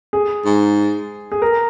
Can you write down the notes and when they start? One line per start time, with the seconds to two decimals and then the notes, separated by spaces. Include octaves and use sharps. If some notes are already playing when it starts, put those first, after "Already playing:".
0.13 G#4
0.45 G#2
1.32 G#4
1.42 A#4